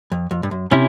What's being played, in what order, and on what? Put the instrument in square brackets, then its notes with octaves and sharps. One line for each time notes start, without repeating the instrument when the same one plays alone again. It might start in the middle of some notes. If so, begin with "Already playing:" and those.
[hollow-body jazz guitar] F2
F2
G2
F#2
[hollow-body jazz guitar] C3 [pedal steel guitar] C#4 E4